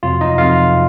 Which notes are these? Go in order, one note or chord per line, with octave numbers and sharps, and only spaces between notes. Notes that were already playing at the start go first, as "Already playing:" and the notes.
F2 C3 F#3 F4
D#4 D#5
F2 C3 F#3 F4 F5